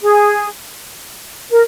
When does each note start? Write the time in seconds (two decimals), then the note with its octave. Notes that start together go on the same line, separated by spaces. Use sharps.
0.03 G#4
1.50 A#4